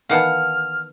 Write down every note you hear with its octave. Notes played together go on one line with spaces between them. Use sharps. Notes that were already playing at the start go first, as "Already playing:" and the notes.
D#3 E3 B3 F5 F#5 A5 F6